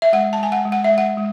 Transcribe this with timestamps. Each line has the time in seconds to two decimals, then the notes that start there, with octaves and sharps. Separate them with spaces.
0.02 E5
0.13 G#3 F#5
0.33 A5
0.38 G#3 G#5
0.52 F#5
0.65 G#3
0.72 F#5
0.84 E5
0.91 G#3
0.98 F#5
1.17 G#3